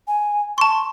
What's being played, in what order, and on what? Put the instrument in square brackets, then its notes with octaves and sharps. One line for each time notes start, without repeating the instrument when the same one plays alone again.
[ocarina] G#5
[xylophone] A5 C6 [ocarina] C#6